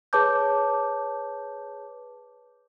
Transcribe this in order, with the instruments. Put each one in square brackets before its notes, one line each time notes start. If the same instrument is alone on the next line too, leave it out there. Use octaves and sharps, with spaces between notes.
[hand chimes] G#4 B4 C#5 A5 D6 G6